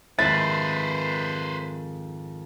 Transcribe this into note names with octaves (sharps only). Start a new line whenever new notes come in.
F2 G#2 D#3 E4 B4 C5 A6